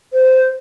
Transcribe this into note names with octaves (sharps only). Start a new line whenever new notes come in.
C5